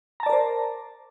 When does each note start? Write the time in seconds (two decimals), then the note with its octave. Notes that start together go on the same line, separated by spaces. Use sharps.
0.20 A#5
0.23 A5
0.26 D5
0.29 A#4
0.33 C5